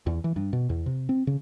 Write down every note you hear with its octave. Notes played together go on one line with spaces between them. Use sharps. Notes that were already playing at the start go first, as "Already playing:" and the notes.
E2
E3
G2
B2
E2
C3
C4
C#3